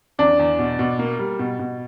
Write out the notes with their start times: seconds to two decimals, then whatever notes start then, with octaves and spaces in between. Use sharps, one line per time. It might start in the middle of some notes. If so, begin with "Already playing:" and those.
0.19 E2 D4
0.39 E2
0.59 B2
0.79 B2
0.99 A#3
1.19 G3
1.39 B2
1.59 B2